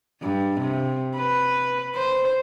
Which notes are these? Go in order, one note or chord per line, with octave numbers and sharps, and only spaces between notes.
G2
C3
B4
C5